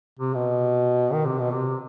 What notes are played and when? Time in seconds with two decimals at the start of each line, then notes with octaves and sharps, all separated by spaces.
0.19 C3
0.35 B2
1.13 D#3
1.26 C3
1.40 B2
1.53 C3